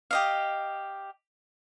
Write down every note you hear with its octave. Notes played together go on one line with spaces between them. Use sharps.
G4 D#5 F5